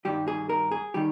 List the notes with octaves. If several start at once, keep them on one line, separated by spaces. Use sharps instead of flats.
G2 D#3 G3 G4
G#4
A#4
G#4
D#3 G3 G4